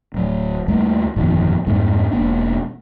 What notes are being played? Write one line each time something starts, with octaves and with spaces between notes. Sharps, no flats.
D1 F#3
D#2 G3 A3
G1 F2 A#2 D#3
F2 G#2 G3 A#3
E1 A#3 D4